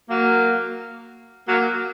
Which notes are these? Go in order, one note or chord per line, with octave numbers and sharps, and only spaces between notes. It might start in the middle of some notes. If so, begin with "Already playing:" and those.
F#3 A#3
F#3 A#3